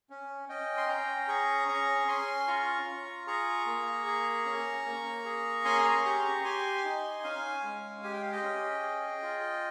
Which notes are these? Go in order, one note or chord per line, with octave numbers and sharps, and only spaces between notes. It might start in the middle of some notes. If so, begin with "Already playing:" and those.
C#4
C#4 D#5 G5
C6
C#4 G5 A#5
G#4 A#5 C#6
C#4 A#5 C#6
C#4 G#5 C6
F4 A#5 C#6
F4
G#4 A#5 C#6
A#3
G#4
C#4
A#3
G#4
C#4 G#5 C6
A#5 C#6
G4 A#5 C#6
C6
A#5 C#6
G4 G#5 C6
D#4
C#4 F5 G#5
G#3
G4 G#5
G5
F5
D#5 G5
C#4
G#4
F4